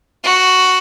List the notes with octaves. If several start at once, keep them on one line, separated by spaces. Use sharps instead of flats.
F#4